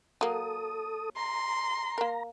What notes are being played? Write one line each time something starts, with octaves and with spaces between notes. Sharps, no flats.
F#3 A#3 A4 D#6
A#5 C6
A#3 A#4